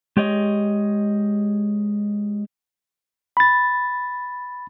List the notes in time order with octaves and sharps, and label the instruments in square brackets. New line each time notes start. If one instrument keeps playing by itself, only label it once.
[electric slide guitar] G#3 G4 C#5 D#5
[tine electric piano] B5 A6